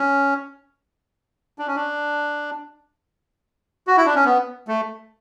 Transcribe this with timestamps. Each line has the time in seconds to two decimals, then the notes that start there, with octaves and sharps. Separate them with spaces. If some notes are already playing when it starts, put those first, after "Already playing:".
Already playing: C#4
1.59 D4
1.67 C#4
1.76 D4
3.87 F#4
3.97 E4
4.06 D4
4.15 C#4
4.25 B3
4.68 A3